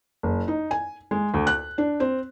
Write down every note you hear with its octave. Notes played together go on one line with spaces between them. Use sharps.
F#1
D#4
G#5
G#3
D2
F#6
D4
C4